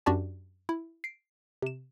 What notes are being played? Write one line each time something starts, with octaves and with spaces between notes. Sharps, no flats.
F#2 D4 F#4 G4 D5 A5
E4
C7 D7
C3 E7